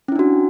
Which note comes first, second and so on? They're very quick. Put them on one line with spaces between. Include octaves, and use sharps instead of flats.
C#4 E4 D4 F#4